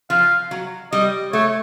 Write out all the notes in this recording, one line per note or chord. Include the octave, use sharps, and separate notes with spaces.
F3 F5
F#3
G3 D#5
A3 C#5